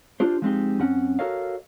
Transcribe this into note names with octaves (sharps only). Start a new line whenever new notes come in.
D4 F4 G4 C5
F3 G#3 C4 D#4 G4
F#2 C4 C#4 F#5
F#4 A4 A#4 C#5 D#5 F5